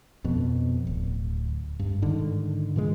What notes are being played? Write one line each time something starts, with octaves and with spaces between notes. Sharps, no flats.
F2 B2
D1
G2
G#2 D3 D#3
A#2 E3 G#3